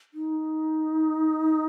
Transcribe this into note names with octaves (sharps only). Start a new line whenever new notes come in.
D#4